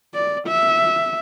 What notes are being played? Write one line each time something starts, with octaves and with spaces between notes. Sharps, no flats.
D5
E5